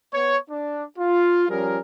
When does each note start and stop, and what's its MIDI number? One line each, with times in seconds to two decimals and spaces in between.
0.14 0.38 59
0.14 0.38 73
0.50 0.84 62
0.99 1.46 65
1.49 1.79 53
1.49 1.79 55
1.49 1.79 61
1.49 1.79 68
1.49 1.79 70